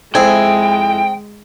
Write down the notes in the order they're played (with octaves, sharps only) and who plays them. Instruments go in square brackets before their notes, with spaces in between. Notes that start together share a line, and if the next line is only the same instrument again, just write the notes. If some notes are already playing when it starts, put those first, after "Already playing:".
[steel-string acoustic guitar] F2 E4 G#5 [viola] G#3 [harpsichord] C4 G#4 [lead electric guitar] G5